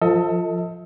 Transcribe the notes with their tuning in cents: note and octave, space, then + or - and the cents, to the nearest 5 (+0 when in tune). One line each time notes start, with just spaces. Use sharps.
F3 +0 A4 +25 D#5 +35